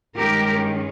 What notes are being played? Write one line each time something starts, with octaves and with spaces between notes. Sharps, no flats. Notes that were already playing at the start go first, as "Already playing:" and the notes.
G2 D#3 G#3 C#4 G4 A#4